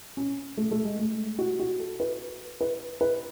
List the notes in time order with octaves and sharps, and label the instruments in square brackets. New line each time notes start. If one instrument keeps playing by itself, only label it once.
[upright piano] C#4
A3
A3
G#3
A3
F#4
F#4
A4
B4
B4
B4